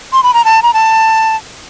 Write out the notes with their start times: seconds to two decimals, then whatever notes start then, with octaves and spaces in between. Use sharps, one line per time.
0.13 C6
0.23 B5
0.34 A#5
0.45 A5
0.63 A#5
0.74 A5